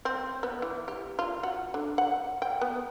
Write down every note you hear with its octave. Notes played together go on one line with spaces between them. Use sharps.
C4
B3
E3
G4
F4
F#4
D3
F#5
G5
B3